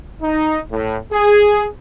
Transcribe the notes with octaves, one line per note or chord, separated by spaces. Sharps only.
D#4
A2
G#4